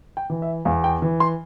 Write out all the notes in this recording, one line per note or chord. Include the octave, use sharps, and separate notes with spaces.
G5
E3
E5
E2 F5
G5
E3
C6